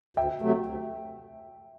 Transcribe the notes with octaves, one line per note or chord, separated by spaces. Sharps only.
D2 E5 G5
C3 F#3 A3
D2